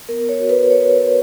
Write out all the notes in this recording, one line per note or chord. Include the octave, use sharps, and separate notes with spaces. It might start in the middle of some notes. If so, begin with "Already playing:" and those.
B3 A#4
C#5
F#4
B4
C#5